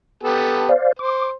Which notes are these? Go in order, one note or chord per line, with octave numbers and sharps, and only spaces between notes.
B3 G4 A4
C5 D5 F5
C5 D6